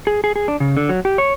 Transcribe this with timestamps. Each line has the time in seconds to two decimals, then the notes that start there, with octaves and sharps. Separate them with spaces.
0.07 G#4
0.24 G#4
0.36 G#4
0.48 D4
0.60 C#3
0.77 D3
0.89 F#3
1.05 G4
1.18 C#5